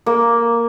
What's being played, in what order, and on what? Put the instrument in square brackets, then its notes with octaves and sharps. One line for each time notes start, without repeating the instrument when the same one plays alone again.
[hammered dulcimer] A#3